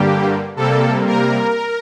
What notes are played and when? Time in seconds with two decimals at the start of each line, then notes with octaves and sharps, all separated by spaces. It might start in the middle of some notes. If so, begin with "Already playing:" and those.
Already playing: G2 D3 G3 A#3 G4
0.56 C3 G3 A#3 A4
1.07 A#4